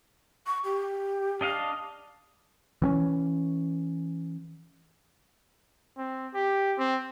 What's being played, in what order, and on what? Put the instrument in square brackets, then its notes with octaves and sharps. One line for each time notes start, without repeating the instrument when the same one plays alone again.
[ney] C#6
G4
[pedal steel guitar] D4 D#5 F5
[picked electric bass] E3 C4 C#4
[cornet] C4
G4
C4